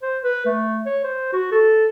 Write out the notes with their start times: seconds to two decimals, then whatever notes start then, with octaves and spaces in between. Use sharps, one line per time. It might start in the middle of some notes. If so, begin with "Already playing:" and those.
0.02 C5
0.23 B4
0.46 A3
0.86 C#5
1.04 C5
1.33 F#4
1.51 A4